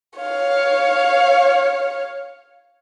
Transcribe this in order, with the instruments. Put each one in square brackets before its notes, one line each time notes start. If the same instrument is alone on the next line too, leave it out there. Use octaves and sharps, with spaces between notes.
[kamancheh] C#5 F5